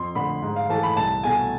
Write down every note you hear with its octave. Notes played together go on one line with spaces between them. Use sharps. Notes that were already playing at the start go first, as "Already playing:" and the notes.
Already playing: F2 C6
D3 A3 B5
G#2
F5
E3 A3 A5
B5
C2 A5
B2 A3 G#5